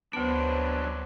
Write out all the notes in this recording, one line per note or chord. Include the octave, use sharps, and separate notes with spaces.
D2 F#3 B3 D4 B4 C5